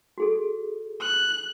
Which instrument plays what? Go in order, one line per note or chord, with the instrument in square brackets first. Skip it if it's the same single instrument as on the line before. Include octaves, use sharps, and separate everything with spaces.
[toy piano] F#4 G#4 A4
[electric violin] F#6